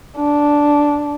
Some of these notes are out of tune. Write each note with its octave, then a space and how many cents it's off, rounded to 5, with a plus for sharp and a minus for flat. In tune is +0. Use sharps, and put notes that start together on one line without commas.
D4 -5